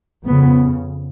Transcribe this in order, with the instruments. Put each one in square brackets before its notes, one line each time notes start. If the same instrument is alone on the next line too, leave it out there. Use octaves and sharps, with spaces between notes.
[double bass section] F2 C#3 B3